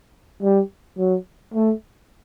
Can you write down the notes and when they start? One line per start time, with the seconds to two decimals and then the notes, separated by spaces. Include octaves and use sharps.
0.43 G3
0.98 F#3
1.54 A3